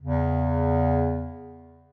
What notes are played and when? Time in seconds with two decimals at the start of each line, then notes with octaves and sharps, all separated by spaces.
0.01 E2 C#3